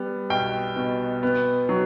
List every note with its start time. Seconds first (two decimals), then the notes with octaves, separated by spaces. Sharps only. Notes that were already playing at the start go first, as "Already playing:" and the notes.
Already playing: G3 B3
0.30 B1 G5
0.76 B2
1.23 B3
1.69 F#3